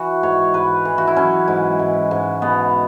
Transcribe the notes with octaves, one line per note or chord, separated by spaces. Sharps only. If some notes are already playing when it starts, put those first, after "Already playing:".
Already playing: E3 F#4
G#2 C#5
G#2 B4
E3
F#4
E4
F#3 C#4
G#2
G#2
G#2
B2 B3